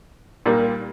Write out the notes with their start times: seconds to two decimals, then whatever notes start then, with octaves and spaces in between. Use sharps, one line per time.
0.46 A#2 G3 A#3